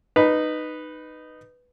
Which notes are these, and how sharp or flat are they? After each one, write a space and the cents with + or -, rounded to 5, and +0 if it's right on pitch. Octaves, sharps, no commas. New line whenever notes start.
D#4 -15 B4 +0